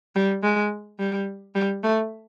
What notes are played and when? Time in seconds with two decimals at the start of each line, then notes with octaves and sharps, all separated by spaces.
0.15 G3
0.43 G#3
0.99 G3
1.55 G3
1.84 A3